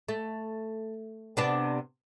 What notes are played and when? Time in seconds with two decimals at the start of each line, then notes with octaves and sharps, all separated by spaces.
0.09 A3
1.37 C3 B3 D4